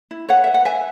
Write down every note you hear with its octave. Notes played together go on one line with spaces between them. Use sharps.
E4
B4 C#5 F#5
B4 E5
F#5
B4 E5 G#5